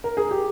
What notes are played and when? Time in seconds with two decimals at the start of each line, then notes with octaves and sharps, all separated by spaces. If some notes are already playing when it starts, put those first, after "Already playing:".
0.04 A#4
0.17 G#4
0.31 G4